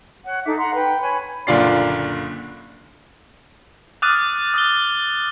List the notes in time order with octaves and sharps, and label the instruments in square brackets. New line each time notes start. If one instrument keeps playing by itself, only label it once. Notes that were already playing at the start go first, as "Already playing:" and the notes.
[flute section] C#5 F#5
D#4 A4 E5 D6
F#5 A#5 C6
B4 G5
C#5 G#5 B5
[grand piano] F#1 A#2 D3 F4 D5 C7
[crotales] D6 D#6 F6 F#6 A6 D#7
D#6 A6 G7